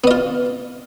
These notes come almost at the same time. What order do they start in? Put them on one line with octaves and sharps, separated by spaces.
B3 D#5 F4